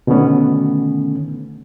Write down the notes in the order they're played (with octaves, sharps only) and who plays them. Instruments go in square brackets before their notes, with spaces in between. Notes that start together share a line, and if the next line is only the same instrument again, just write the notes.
[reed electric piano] B2 D3 D#3 A3 B3 C#4